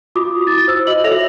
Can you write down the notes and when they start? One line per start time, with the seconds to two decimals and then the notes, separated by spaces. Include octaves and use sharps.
0.16 F4 F#4 D6 D#6
0.47 E4 A6
0.68 C5 E6
0.87 F#4 D#5 F#7
1.04 A4 C#5 E5 A#6 F7